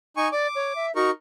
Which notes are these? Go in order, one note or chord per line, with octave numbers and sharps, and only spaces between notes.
D#4 G#5 C#6
D5 D6
C#5
E5
D#4 F#4 A#4 C#6